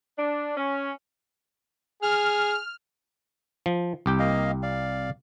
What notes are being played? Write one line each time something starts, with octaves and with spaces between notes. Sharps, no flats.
D4
C#4
G#4 F6
F3
C2 G4 G5
A#3 D#5 F5
D5 F5